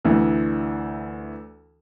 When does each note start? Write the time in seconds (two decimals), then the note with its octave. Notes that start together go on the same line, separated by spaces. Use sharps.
0.05 D2 E3